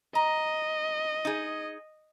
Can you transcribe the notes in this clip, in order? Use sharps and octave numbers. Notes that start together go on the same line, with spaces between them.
D#5 A#5
D#4 G#4